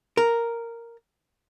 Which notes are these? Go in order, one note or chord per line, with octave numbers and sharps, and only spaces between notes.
A#4